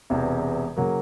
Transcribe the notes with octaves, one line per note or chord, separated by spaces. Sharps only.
E1 E2 C3
C#3 F#3 A#3